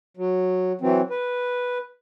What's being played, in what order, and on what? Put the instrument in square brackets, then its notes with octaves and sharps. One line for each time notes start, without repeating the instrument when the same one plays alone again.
[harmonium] F#3
E3 F#3 C4
B4